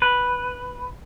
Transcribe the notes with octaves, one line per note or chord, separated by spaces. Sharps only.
B4